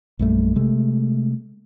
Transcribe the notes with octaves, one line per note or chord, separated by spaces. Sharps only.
A#1 F#2 G3 A3
C3 G#3 A3